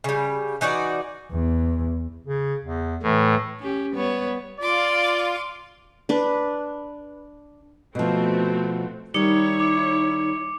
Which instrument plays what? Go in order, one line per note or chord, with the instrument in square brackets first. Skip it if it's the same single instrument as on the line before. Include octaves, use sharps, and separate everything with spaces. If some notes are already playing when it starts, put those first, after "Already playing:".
[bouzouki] C#3 G3
E3 D#4 F#4 D5
[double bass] E2
[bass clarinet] C#3
E2
[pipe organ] A2 [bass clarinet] E3
[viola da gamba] C#4 G4
G3 B3 C#5
[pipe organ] F4 [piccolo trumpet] D5 [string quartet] C6 D6
[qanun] D4 B4
[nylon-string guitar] B2 F3 [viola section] A3 C4 F#4
[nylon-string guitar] D#3 G3 [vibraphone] D#4 [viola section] E4 C#5 [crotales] D6 C#7
[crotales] D6